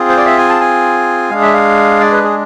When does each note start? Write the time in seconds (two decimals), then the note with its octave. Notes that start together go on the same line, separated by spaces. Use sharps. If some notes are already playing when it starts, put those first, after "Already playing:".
Already playing: C4 F4 G#4
0.09 C5
0.17 D5
0.26 E5
0.38 G#5
0.49 A5
0.61 G#5
1.30 G#3 D4 G#4 F5
1.42 E5
1.53 F5
2.00 D5
2.12 B4
2.23 G#4